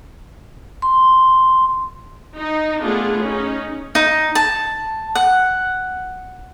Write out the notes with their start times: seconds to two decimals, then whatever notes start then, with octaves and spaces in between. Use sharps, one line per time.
0.82 C6
2.36 D#4
2.81 A3 B3 D4 F4 G#4
3.21 C#4 D#4
3.95 D#4
4.35 A5
5.15 F#5